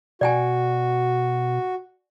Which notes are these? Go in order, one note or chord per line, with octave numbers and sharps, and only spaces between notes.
B2 F#4 D5 G5 G#5